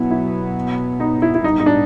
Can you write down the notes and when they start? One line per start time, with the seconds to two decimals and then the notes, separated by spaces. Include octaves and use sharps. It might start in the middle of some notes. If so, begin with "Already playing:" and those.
Already playing: B2 F#3 B3 E4
0.11 E4
1.00 D#4
1.22 E4
1.34 E4
1.44 A#2 G3 B3 D#4
1.60 D#4
1.66 D4